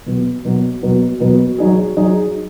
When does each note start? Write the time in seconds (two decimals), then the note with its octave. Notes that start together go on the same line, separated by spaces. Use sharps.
0.06 B2 F#3 B3 F#4
0.45 B2 F#3 B3 F#4
0.82 B2 F#3 B3 F#4
1.20 B2 F#3 B3 F#4
1.58 F#3 D#4 G#4
1.97 F#3 D#4 G#4